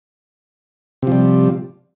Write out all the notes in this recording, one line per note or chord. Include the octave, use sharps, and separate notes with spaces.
C3 F3 G3